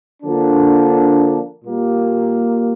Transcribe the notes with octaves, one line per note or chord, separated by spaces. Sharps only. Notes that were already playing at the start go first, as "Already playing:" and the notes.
D3 F3 A#3 D4
A#2 G3 A#3